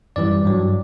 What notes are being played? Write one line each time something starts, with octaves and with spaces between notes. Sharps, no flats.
F#2 E3 G3 D5
G2 F#3